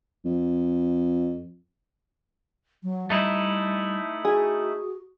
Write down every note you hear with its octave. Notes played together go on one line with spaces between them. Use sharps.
F2
F#3
G3 A3 D#4 E4
F#4 G#4